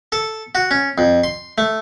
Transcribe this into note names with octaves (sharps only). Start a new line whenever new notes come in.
A4
F#4
C#4
F2
C6
A3